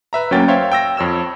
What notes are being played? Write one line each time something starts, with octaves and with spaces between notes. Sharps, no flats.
B4 E5 A#5
D2 F#3 A#3 C#4 G5 A6
C5 C#5 E5 F5 G5 C6
G5 E6 A#6
F2 C#5 E6 E7